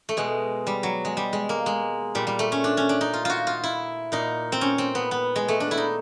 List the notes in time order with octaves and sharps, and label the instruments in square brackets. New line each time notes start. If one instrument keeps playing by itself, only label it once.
[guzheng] A3
B2 G#3
G3
F#3
G#3
G3
G#3
A#3
G#3
A#2 G3
G3
A3
C#4
D4
C#4
D4
D#4
F4
F4 F#4
F4
E4
A#2 D#4
C4
C#4
C4
B3
B3
G#3
A3
D4
E4
D#4